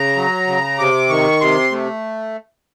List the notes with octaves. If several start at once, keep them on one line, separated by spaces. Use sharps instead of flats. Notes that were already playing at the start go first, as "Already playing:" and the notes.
Already playing: C#3 A#5
F#3
C#3
C3 D6
D#3 C#6
C3 C6
A3